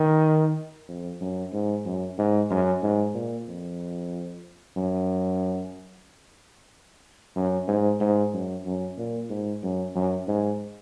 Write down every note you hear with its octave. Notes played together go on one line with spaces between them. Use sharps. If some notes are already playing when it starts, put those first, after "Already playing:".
Already playing: D#3
F2
F#2
G#2
F#2
G#2
F#2
G#2
A#2
F2
F#2
F#2
G#2
G#2
F#2
F#2
A#2
G#2
F#2
F#2
G#2